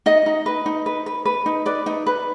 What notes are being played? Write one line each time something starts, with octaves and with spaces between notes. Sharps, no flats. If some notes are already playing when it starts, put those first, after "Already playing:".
D#4 D#5
D#4
B4
D#4
B4
B4
B4
D#4
B4 D5
D#4
B4